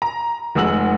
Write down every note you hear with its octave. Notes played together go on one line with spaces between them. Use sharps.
A#5
F1 G#3 F#5 E6 F#7